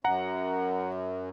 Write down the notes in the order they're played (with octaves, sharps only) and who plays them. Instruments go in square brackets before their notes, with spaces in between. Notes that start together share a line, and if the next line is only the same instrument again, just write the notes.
[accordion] F#2 [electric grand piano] F#5 A#5